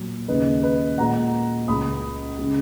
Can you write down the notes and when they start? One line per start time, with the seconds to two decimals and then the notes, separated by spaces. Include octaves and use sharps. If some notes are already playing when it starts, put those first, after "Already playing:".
Already playing: A#2 F#3
0.28 D#2 C#3 G#3 B4 D#5
0.63 B4 D#5
0.98 A#2 G#3 F#5 A#5
1.68 C#2 C#3 G#3 B5 D#6
2.38 C#3 G#3